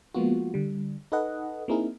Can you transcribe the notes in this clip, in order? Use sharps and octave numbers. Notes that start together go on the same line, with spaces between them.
F3 G#3 A#3 B3 F4 F#4
D3 G3
D#4 A4 B4 D#5 F#5
A#3 C4 D#4 E4 G#4 A#4